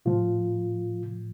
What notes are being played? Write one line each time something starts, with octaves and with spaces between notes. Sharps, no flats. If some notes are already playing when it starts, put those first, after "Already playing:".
A2 F3 F4